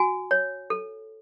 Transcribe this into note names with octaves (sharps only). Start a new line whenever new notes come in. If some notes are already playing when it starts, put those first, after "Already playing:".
Already playing: F#4 G#5
C#5
A4